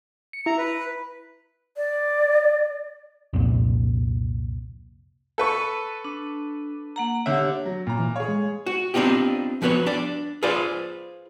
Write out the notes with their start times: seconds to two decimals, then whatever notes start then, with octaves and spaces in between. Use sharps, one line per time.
0.33 C#7
0.46 E4 A#5
0.58 B4
1.77 D5
3.33 C2 F2 A#2
5.38 A4 B4 C#6
6.05 D4
6.96 A#3 F#5 A#5
7.26 D3 G4 C#5 E5
7.66 F#3
7.87 A#2 A#5
7.99 E3
8.16 G#4 C#5 F5
8.28 G#3
8.66 F#4
8.94 B3 C4 D4 D#4 F4 G4
9.62 F3 B3 F#4 B4 C#5
9.86 D4 B4 D5
10.43 F4 G#4 B4 C5 D5 F5